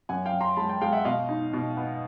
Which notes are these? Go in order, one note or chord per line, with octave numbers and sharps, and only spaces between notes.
F#2 F#5 G#5
F5 G5
F#2
A#5 C6
G#3 A5 B5
G5 A5
G#3 F5 G5
E5 F#5
B2 D#5 F5
D#4
B2
B3